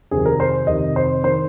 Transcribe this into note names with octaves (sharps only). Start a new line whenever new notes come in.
F2 C3 D#3 G#4
A#4
C5
F2 C3 D#3 D#5
C5
D#3 C5